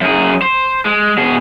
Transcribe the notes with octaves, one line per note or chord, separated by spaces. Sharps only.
F#2 G#4
C5
G#3
B2 G#4